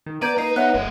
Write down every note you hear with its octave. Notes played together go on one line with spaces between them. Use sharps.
D#3
B3 D5 A#5 G6 G#6 D#7
A#3 D#4 B4 D#5 A#5 C7
B3 C#5 E5 F#5 F#6
F#1 A3 D#5